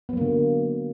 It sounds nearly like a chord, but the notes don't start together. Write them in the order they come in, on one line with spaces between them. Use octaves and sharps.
B3 F#3 A#3 D3